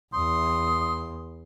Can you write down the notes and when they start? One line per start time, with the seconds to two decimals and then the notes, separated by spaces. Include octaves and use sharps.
0.14 E2 C6 D#6